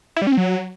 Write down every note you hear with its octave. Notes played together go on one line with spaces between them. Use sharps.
E4
G3
C#4
C4
F#3